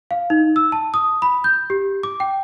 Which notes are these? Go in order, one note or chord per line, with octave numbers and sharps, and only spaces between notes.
F5
D#4
E6
A5
D#6
B5
G6
G4
D6
G5